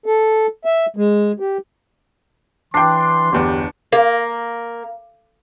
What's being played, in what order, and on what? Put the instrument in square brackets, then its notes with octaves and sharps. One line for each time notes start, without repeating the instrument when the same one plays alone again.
[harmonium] A4
E5
G#3
G4
[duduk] E3 [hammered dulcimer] D4 [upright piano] G5 C7 [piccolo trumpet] C6
[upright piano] G1 E2 [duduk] G4
[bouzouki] A#3